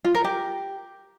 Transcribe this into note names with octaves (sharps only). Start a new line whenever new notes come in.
F4
A#4
G4